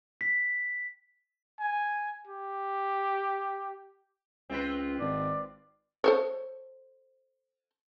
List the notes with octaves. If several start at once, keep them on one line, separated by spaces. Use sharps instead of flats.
B6
G#5
G4
C#2 C4 F4 B4
G#1 D5
A4 C5 C#5